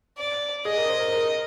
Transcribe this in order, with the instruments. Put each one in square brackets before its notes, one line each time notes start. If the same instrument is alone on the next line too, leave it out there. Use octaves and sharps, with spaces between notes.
[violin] D5
[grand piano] G#4 [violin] D#5
[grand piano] A#4
C5
A#4
A#4